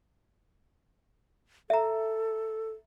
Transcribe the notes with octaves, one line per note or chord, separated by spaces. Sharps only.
A4 E5 A#5